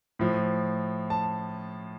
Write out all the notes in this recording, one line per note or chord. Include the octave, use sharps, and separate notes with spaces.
A2 F3
A5